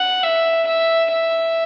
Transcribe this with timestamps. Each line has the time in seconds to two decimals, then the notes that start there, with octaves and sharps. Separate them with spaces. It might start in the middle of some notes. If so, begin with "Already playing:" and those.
Already playing: F#5
0.23 E5
0.67 E5
1.12 E5